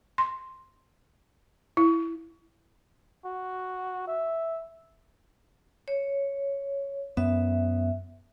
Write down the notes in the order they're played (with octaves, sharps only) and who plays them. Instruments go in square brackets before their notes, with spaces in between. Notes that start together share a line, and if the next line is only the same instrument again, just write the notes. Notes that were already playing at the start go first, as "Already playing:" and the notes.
[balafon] C6
E4
[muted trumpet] F#4
E5
[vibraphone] C#5
[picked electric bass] F#2 B3 [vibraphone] E5